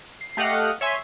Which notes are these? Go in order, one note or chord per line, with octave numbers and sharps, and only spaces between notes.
C7
A3 G4 D#5 F5 F#5
C#5 E5 G#5 C6 B6